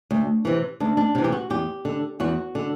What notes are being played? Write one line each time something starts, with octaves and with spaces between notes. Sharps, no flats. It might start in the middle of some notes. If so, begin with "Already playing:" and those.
D2
C3 E3
D2 D4
D4
C3 E3
G4
F#4
E2 G4
D3
E2 F#4
D3